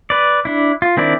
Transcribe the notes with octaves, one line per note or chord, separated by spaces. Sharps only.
B4 D5
D4 E4
F4
D#3 C4 D4 E4 D5